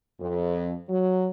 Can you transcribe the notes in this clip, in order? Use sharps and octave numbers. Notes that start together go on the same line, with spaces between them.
F2
F#3